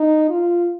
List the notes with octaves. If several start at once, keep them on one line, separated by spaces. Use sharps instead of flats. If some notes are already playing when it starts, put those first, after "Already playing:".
Already playing: D#4
F4